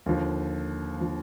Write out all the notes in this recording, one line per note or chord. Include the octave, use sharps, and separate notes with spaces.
D#2 D3 F3
D3 F3